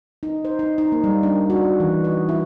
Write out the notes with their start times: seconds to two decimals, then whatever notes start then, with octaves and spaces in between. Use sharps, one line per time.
0.23 D#4
0.45 C5
0.59 D#4
0.78 D#4
0.92 A#3
1.04 G3
1.23 D4
1.50 F#4
1.80 E3
2.04 D#5
2.29 E4